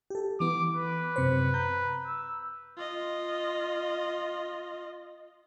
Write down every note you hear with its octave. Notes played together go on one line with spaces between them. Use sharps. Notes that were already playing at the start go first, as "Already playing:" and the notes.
G4 A4
E3 B3 D6
B4
F#2 C3 C5
A#5 G6
E6
F4 D#5